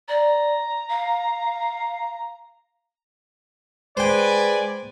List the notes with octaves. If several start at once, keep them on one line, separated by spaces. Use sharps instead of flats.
D5 A#5
F5
G#3 B4 C5 D5 G5 G#5